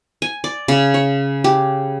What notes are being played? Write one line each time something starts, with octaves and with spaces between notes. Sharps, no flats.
G#5
D5
C#3
C#5
G4